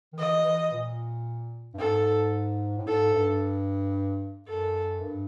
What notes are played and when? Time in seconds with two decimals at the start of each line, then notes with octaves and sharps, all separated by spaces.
0.13 D#3
0.18 E3 D#5
0.45 E3
0.72 A#2
1.74 G2
1.79 G#2 A4
2.77 A2
2.87 G#2 A4
3.14 G2
4.48 F#2 A4
5.01 G2